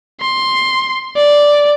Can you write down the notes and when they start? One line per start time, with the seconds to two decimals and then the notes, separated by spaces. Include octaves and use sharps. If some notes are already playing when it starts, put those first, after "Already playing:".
0.21 C6
1.16 D5